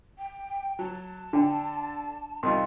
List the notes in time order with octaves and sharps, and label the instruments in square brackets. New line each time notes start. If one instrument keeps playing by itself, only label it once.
[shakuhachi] G5
[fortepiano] F#3 [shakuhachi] A5
[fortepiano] D3 [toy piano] D4 G5
[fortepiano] C2 D#4 F4 [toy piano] C6